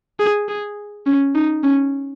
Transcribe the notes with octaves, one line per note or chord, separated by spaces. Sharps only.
G#4
G#4
C#4
D#4
C#4